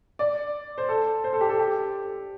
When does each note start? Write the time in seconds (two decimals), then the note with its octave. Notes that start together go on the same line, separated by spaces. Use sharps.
0.19 D5
0.78 C5
0.89 A4
1.24 C5
1.33 A4
1.41 G4
1.49 A4
1.59 G4